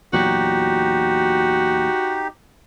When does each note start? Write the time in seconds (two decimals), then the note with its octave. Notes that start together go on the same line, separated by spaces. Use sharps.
0.13 E2 A#2 F#3 D#4 F#4 G4